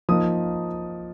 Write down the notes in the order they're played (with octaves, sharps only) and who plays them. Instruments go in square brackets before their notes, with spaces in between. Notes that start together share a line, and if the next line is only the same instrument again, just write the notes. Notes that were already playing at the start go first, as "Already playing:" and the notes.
[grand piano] F3 A#3 D#4 D#6